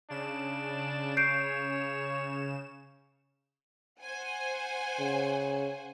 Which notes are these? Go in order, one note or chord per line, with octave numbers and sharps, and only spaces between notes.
C#3 D4 E7
C#5 G6 C7 D7
C5 F#5 G#5
C#3